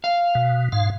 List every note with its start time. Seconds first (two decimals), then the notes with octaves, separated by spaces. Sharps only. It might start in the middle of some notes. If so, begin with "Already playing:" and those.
0.04 F5
0.35 B2
0.72 G#2 F5